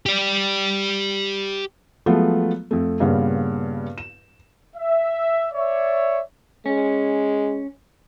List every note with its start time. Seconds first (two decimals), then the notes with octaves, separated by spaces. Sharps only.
0.06 G4 D5
2.06 F3 F#3 G#3 A3 B3 F4
2.71 F2 A3
3.00 G2 A#2 C#3 B3
3.98 E7
4.77 E5
5.53 C#5 D5 E5
6.66 G#3 C#4